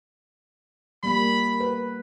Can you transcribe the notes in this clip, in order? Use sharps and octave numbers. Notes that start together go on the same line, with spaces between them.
G3 A#3 B5
B4